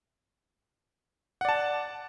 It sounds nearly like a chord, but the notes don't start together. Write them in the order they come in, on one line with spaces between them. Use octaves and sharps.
F#5 D5 A5